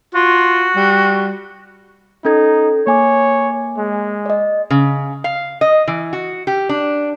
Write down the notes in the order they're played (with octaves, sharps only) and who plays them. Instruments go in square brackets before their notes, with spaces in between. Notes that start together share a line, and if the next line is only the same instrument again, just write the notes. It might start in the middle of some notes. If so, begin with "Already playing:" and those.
[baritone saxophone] F4 [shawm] F#4
[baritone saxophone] G3
[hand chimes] C#4 A4 G#6 [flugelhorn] D#4
[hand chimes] A#3 G#5 D6 [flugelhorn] C#5
[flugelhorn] G#3
[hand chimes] D5 D#5
[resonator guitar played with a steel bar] C#3
F5
D#5
E3
F#4
G4
D4